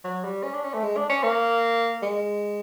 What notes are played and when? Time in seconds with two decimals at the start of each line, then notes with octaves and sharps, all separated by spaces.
0.04 F#3
0.24 G3
0.43 C#4
0.54 D4
0.64 C#4
0.74 A3
0.84 G#3
0.97 D4
1.09 C#4
1.24 A#3
2.02 G#3